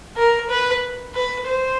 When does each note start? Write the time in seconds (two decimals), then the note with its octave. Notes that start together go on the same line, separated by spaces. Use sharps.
0.16 A#4
0.49 B4
1.15 B4
1.47 C5